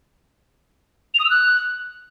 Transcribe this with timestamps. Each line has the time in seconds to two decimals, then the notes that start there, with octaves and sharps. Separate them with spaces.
1.14 F7
1.19 D#6
1.25 E6
1.30 F#6